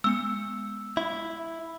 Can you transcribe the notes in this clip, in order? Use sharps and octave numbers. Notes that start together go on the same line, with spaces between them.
G#3 B3 E6 C#7
E4